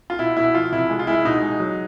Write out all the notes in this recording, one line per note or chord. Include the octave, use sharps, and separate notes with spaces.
F4
B2 E4
B2 E4
F3 F4
C3 E4
G#3
F4
G#3 E4
B2 D#4
G#3
F#3